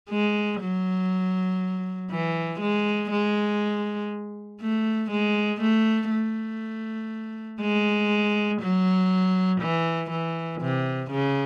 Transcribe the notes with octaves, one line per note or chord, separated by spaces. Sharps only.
G#3
F#3
E3
G#3
G#3
A3
G#3
A3
A3
G#3
F#3
E3
E3
C3
C#3